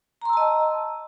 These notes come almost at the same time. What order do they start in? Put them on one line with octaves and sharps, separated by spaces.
A#5 C6 E6 A5 D#5